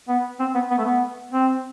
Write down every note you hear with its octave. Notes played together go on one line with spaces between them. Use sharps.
B3
C4
B3
B3
A3
B3
C4